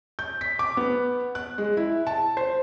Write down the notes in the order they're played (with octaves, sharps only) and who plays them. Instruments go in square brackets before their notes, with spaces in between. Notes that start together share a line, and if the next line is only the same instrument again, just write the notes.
[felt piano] G6
B6
D6
B3
F#6
G#3
E4
A5
C5